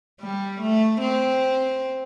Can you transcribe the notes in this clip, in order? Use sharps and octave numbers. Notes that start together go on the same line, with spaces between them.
G3
A3
C4